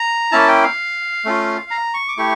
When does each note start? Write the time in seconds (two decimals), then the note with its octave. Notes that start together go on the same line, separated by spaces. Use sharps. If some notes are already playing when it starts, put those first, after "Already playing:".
Already playing: A#5
0.32 A#3 C#4 E4 A5
0.48 G5
0.63 F5
1.25 A3 C#4 F4
1.71 A#5
1.94 C#6
2.08 D6
2.17 A3 E4 G4 C#6